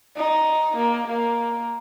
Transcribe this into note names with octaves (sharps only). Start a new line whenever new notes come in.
D#4
A#3
A#3